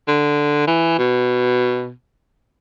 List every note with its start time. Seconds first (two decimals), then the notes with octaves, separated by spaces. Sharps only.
0.08 D3
0.67 E3
0.98 B2